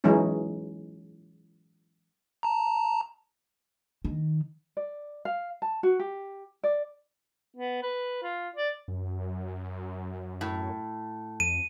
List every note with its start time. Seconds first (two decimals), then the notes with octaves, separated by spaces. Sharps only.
0.04 E3 F#3 G#3 C#4 D#4
2.43 A5 A#5
4.05 D#3
4.77 D5
5.25 F5
5.62 A5
5.83 F#4
5.99 G4
6.64 D5
7.57 B3
7.83 B4
8.23 F4
8.56 D5
8.88 F#2
10.41 A2
11.40 F2 D#7